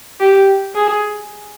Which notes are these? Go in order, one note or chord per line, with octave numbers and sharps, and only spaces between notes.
G4
G#4